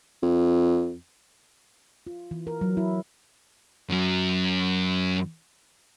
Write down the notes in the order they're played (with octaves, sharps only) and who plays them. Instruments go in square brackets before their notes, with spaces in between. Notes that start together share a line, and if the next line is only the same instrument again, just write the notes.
[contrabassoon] F2
[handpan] F4
E3
A#4
F#3
E4
[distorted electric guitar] F#2 F#3